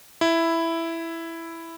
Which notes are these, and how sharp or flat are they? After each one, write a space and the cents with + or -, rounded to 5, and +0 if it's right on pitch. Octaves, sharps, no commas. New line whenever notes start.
E4 +5